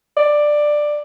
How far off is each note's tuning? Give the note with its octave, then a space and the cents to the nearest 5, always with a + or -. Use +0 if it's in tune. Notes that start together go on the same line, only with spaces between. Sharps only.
D5 +10